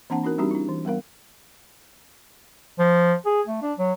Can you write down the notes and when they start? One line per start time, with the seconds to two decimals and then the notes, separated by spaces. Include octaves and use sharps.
0.10 E3 A#3 C4 D4 F#5 A5
0.23 C#4 D#4 F#4 A#4
0.38 G3 C4 D4 D#4 F#4 G4
0.51 D4 E4
0.68 E3
0.85 G3 B3 A#4 F5
2.79 F3
3.26 G#4
3.47 A3
3.62 D4
3.78 F#3